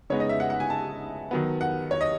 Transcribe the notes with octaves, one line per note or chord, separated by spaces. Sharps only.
C#3 G#3 B3 D#4 C#5
D#5
E5
F#5
F#5
G#5
A5
D#3 F#3 B3
F#5
C#5
D#5